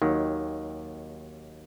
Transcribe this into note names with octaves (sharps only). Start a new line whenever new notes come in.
D#2 D#3 F#3